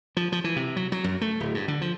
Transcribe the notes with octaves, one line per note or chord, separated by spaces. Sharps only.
F3
F3
E3
C3
F#3
F#3
F#2
A3
D1
G2
D3
F3